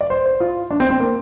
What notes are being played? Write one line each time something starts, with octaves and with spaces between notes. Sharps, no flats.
D5
C5
C5
F4
D4
C4
C4
A#3